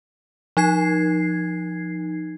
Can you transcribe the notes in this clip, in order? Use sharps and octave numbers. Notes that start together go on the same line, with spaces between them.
F3 D#4 G#6 C7